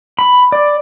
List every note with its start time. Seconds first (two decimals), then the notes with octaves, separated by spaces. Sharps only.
0.19 B5
0.52 D5